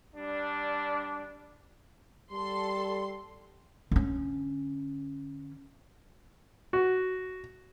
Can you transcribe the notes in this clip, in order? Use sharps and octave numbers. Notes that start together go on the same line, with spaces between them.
G3 D4
G3 A4 C6
D3 C#4
F#4